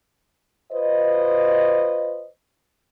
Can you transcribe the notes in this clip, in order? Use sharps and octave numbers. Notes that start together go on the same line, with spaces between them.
F4 B4 C5 D#5